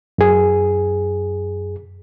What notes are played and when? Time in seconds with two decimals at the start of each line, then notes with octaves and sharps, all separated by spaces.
0.18 F#2 G#4